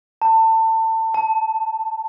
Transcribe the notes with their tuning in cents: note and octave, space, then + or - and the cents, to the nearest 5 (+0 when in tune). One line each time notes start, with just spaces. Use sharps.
A5 +25
A5 -5